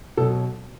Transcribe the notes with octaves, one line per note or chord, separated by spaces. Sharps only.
B2 F#3 A4